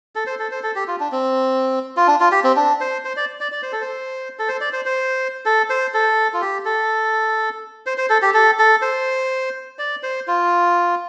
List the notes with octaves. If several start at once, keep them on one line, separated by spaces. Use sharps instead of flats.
A4
C5
A4
C5
A4
G4
F4
D4
C4
F4
D4
F4
G4
C4
D4
C5
C5
D5
D5
D5
C5
A4
C5
A4
C5
D5
C5
C5
A4
C5
A4
F4
G4
A4
C5
C5
A4
G4
A4
A4
C5
D5
C5
F4